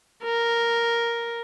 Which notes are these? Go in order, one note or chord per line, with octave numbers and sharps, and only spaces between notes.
A#4